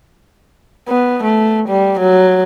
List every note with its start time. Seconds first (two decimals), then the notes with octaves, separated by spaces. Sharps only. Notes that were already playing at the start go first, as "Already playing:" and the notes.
0.88 B3
1.24 A3
1.69 G3
2.00 F#3